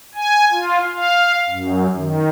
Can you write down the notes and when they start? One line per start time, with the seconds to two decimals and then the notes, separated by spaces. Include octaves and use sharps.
0.15 G#5
0.52 F4
0.94 F5
1.49 F#2
1.96 D#3